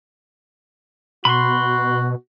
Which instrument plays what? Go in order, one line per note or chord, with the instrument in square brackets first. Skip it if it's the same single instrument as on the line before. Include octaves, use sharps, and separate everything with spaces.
[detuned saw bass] B2 [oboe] F#4 [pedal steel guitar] B5 C6